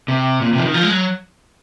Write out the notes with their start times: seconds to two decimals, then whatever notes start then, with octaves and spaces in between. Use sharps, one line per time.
0.08 C3
0.42 A#2
0.53 C3
0.58 F3
0.63 D#3
0.74 F3
0.83 G#3
0.91 F#3